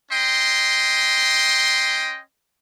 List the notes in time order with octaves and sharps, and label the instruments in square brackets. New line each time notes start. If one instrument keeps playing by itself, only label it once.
[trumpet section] C#4 D#5 G5 C6